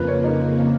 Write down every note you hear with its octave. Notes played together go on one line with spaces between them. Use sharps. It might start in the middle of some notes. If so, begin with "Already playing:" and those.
Already playing: F2 C#3 F3 A#3 F4 B4
C#5
D#4